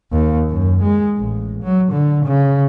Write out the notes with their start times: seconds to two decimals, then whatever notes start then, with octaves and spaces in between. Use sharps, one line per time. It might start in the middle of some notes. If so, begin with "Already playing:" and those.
0.12 D#2
0.50 F#2
0.82 G#3
1.17 A1
1.63 F#3
1.92 D3
2.25 C#3